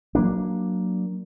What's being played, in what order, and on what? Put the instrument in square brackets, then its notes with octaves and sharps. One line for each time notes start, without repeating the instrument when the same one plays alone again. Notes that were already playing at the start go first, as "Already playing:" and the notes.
[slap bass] F#3 A#3 D4